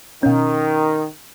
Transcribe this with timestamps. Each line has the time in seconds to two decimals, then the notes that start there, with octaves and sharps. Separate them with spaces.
0.23 B2 D#3 C#4